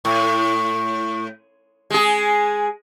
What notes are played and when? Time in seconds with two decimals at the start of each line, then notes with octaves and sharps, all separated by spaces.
0.05 A2 C#6
1.91 G#3 G#4 G#5